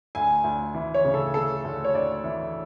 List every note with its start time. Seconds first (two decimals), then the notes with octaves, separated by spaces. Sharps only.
0.15 D2 G#5
0.44 D2
0.74 E3
0.94 C#5
1.04 C#3
1.14 A4
1.34 E3 A4
1.64 D2
1.84 C#5
1.94 D2 D5
2.24 E3